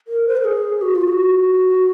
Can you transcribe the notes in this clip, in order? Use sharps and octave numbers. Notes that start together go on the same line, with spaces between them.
A#4
C5
A#4
G#4
F#4
F4
F#4